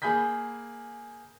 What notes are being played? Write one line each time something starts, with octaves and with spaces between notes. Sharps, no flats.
A#3 G#4 G#5 B5 G6 B6